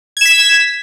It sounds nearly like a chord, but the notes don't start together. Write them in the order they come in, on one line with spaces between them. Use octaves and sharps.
G#6 E7 B6